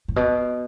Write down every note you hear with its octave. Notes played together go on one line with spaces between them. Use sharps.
A2
B2